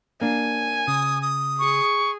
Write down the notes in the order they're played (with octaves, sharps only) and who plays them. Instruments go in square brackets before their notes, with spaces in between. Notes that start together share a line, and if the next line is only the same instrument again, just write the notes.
[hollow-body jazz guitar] A#3 D4 [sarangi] G#5
[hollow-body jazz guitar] C#3 [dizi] D#6
[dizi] D#6
[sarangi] G#4 [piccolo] C#6